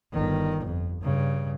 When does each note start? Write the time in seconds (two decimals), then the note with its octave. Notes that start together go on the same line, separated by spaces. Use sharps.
0.12 G1 D#3
0.64 F2
1.01 G2 C#3